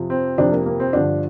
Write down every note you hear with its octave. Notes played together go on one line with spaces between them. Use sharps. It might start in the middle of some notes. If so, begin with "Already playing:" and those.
Already playing: F2 C3 F3
C4
F2 C3 F3 D4
A#3
A#3
C4
G2 D3 F3 D4